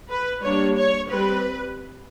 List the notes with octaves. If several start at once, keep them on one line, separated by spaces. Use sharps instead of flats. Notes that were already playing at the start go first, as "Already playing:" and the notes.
B4
G3 A#3 D4 C#5
C#5
G3 C4 B4